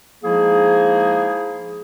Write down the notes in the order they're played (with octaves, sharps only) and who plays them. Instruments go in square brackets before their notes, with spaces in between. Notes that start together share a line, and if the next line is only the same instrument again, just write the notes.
[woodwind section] F3 G#3 A#3 D#4 E4 G#4